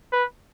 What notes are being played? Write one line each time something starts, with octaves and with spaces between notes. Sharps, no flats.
B4